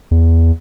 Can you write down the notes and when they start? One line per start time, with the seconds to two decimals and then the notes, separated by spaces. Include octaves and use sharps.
0.11 E2